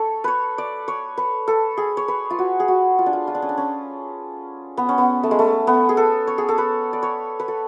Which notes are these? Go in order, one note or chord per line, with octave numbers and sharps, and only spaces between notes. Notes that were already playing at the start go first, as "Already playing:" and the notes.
Already playing: A4 C#5
B4 C#5
D5
C#5
B4
A4
G#4
C#5
B4
F4
F#4
G#4
F#4
F4
D4
F4
F4
D4
C#4
D4
C#4
B3
C#4
B3
A3
G#3
A3
B3
G#4
A4
C#5
G#4
A4
B4
D5
C#5
B4
A4